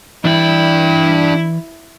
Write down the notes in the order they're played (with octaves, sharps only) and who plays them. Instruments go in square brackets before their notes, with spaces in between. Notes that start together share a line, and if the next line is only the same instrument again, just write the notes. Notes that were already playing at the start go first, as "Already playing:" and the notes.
[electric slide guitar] E3 D5 [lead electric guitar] D4 G5 [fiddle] E4